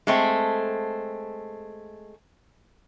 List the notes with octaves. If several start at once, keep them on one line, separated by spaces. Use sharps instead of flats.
G#3 A3 C4